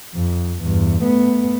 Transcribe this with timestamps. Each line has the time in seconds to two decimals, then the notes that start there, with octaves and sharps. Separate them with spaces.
0.15 F2
0.63 E2 G2
1.03 A3 B3